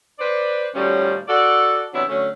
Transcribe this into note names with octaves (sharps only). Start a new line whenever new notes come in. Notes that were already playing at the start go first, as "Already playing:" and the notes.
B4 C5 D5
D#2 A2 F3 G3 C#4 F#4
F#4 A4 D5
C3 E3 F#3 B3 D4 E4
D3 F#3 A3 C#4